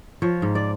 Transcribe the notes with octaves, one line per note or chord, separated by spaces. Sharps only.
F3 C#5
G#2
D5